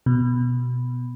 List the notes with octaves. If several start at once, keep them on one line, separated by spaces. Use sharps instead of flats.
B2